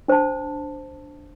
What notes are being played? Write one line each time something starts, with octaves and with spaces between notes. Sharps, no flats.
D4 C5 A5